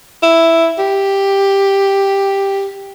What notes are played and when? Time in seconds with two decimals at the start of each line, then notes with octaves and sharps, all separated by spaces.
0.23 E4
0.79 G4